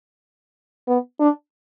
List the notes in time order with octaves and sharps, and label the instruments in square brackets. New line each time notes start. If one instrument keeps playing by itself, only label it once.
[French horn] B3
D4